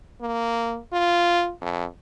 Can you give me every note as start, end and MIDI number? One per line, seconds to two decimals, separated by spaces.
0.21 0.78 58
0.93 1.52 65
1.61 1.85 41